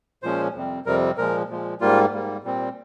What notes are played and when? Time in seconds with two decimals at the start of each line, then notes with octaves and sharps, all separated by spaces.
0.23 A#2 F3 G#3 C#4 C5
0.54 F2 C3 G3 C4
0.86 F2 C3 G3 C4 A#4
1.17 A#2 F3 G#3 A#4
1.49 A#2 F3 G#3
1.80 G#2 G3 A#3 F4
2.12 G#2 G3 A#3
2.44 A#2 G3 C4